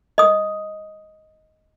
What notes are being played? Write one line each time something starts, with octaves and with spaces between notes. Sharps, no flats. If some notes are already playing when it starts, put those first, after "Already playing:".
D#5 D#6